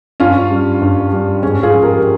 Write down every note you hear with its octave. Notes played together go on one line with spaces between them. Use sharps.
G2 C#4 F4
G3
G2
G3
G#2 C#4
F4 G#4
F3
G4 A#4